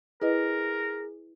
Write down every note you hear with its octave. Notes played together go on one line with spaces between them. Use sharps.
E4 G#4 A#4 B4 D#5